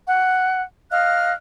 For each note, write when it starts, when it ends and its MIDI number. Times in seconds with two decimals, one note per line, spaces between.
0.06 0.62 78
0.91 1.33 75
0.91 1.33 77
0.91 1.33 89
0.91 1.33 90